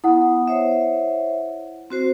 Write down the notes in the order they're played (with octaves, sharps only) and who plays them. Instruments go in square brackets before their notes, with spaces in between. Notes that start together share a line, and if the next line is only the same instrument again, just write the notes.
[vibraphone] B3 D#6 [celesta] E4 F#5
[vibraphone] C5 C#5 E5
C4 F#4 C5